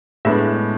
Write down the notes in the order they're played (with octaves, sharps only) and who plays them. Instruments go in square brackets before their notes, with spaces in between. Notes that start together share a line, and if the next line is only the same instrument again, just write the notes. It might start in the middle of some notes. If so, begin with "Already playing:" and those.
[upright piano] A2 G#3 B3 D4 E5